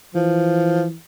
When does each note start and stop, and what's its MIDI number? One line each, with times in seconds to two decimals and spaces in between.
0.15 0.95 52
0.15 0.86 53